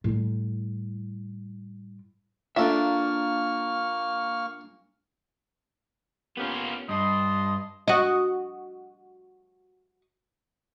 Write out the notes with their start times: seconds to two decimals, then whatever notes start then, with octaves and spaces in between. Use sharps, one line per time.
0.04 A2 G3
2.57 A#2 A#3 D4 A4 E5 C#6 F6
6.37 A#3 B3 C#4 F4 G4
6.89 G2 D#5 A5 C6
7.88 F#4 D#5